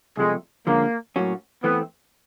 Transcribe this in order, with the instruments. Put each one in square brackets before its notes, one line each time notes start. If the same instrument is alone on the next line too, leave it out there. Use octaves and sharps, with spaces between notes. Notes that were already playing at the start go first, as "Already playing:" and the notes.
[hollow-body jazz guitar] C2 C3 F3 A3 [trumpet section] G#3
[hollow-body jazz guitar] D3 F3 G#3 C#4 [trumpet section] A#3
[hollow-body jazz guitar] A2 F#3 A#3 C#4 F#4
[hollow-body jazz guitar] E3 A3 C4 [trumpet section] B3